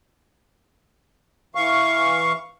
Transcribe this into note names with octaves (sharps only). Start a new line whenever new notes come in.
E3 F5 C#6